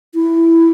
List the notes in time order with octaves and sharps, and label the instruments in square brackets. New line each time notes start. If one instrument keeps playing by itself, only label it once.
[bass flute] E4